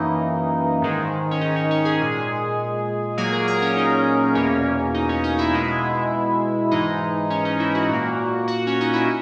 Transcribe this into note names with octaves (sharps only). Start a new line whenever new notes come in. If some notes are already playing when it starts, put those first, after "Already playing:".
Already playing: F#2 E3 A#3 D#4
G#2 D#3 G#3
C#4
D#4
C#4
C#4
G#4
A#2 G#3
A#2 F#3 A#3 G#4
A#4
A#4
C#4
D#4
E2 B2 A#3 C#4
D#4
C#4
D#4
E4
B2 G#3
G#2 E3 G#3 D#4
C#4
D#4
E4
F#4
A#2 A#3
F#4
C#4
D#4
E4